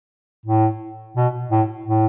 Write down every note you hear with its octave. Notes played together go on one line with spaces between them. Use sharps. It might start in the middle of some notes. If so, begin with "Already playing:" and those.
A2
B2
A2
A2